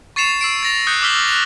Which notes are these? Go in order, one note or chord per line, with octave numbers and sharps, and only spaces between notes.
C#6 A6 C7 C#7 E7 F7
E6 C7 D7
A6 A#6 F7
D#6 F#6 G6 C#7
D6 E6 F6 B6 G7
F#6 F7